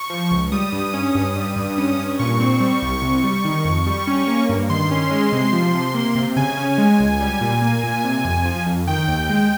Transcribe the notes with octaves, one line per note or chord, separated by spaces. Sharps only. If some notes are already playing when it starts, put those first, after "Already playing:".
Already playing: C#6
F3
C#2
G3 D#6
G2
C#4
G2
G3
G2
C#4
G2
A#2 C#6
C4
G3
C2
C3
G3
D#3
F2
G3
C#4
A#3
G2
D#3 C6
C#4
G#3
C3
F3
C3
A#3
C3
C#3 G#5
C#4
G#3
C#2
G3
A#2
A#3
A#2
C3
F2
F3
F2
D#3 G5
D#2
G#3